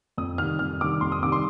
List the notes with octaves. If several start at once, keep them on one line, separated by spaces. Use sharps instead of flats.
F2 D#6
C3 D#3 G3 F6
F2 F6
C3 D#3 G3 D6
F2 C6
D#6
C3 D#3 G3 D6
C6